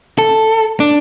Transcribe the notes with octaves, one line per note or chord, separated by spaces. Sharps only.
A4
D4